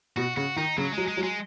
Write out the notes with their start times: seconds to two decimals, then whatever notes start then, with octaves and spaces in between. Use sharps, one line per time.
0.17 B2 F#4
0.36 C#3 F#4
0.56 D#3 D#4
0.77 C#3 F#3
0.93 F#3 G#3
1.08 G#3
1.17 F#3
1.23 G#3